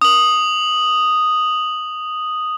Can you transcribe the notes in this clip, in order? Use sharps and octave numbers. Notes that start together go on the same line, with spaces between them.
D#6 F#7